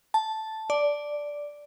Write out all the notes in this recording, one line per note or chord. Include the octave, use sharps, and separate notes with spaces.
A5
D5